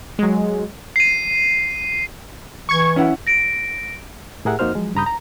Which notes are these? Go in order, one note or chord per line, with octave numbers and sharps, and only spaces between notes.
F#3 G#3
C7 D#7
E3 C#6 G#6
C#4 E4 F#5
A#6 D7
A2 G4 G#4 A#4 E5 F#5
F2 A#3 D#4 F#4 C5 F6
F3 F#3 G#3
G2 C#3 A#5 B5 D#6 G6
A#5